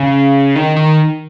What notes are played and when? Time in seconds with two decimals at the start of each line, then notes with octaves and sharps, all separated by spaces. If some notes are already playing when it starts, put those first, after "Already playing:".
Already playing: C#3
0.56 D#3
0.76 D#3